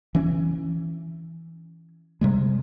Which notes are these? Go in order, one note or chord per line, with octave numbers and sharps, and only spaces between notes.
E3 C#4
C3 G3 G#3